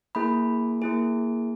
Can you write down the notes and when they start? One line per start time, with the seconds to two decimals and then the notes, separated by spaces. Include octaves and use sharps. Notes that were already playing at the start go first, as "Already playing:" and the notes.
0.15 A#3 E4 G#4 B5
0.82 A#3 E4 G#4